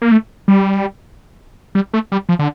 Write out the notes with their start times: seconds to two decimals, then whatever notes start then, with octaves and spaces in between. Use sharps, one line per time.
0.02 A#3
0.12 A3
0.48 G3
1.75 G3
1.94 A3
2.12 G3
2.29 F3
2.39 D3